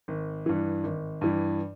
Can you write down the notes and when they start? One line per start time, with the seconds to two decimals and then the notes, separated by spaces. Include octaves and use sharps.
0.08 G#1
0.46 G2 E3
0.84 G#1
1.21 G2 E3